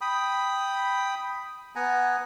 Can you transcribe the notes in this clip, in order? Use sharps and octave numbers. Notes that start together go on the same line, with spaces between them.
G5 B5 D#6
B3 F#5 G#5 A#5